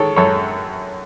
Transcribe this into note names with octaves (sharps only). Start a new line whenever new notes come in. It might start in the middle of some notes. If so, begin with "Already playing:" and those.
Already playing: D#3 G#3 A4 C#5
F#2 A4 C#5